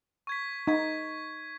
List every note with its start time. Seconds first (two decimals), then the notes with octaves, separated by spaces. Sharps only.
0.27 C#6 G#6 B6
0.67 D#4 C#6 G#6 B6